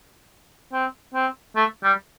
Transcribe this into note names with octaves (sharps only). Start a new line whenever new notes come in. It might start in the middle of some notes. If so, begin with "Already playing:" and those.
C4
C4
A3
G3